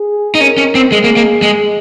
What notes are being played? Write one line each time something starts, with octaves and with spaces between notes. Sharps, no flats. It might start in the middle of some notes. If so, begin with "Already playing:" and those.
Already playing: G#4
D#4
C#4 A#4
C#4
C4
G#3 G#4
A#3
A#3
G#3